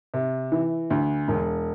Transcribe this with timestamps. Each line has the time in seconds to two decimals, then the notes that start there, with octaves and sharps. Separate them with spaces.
0.14 C3
0.52 E3
0.90 D2
1.28 E1